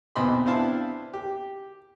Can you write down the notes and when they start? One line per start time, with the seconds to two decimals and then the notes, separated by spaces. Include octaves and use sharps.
0.15 B1 E2 C4 D#5 B5 C6
0.46 B3 C4 D4 E4 F5 A5
1.14 G4